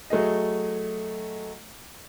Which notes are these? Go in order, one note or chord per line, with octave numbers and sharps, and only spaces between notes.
F#3 A3 G#4 D#5